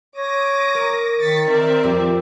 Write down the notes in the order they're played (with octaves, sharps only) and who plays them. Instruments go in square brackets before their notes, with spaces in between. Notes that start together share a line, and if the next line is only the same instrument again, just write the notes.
[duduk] C#5 [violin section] D6 D#6 A#6
[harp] A#4
[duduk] D#3 [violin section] A6 B6 C#7
[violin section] C4 D5 E5 [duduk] A#4
[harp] F2 [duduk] G4